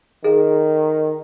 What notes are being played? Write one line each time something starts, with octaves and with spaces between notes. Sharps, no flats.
D#3 G#4